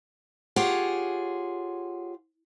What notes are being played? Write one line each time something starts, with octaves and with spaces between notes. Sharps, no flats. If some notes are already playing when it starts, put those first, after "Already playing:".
F4 G4 G#4 C#5 F#5